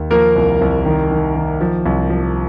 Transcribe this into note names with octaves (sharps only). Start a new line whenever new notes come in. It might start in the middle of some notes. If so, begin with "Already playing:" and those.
Already playing: D#2
F3 A#3 A#4
C2
C2
D#3
D#3
D#3
F3
C2
F3